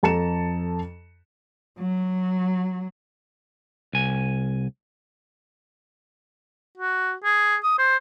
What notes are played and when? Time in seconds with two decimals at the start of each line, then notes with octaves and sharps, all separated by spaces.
0.03 F2 A4 A5 A#5 C#7 E7
1.79 F#3
3.93 C2 G#5
6.78 F#4
7.24 G#4
7.64 D#6
7.79 C5